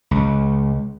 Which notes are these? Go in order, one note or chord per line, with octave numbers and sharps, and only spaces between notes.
C#2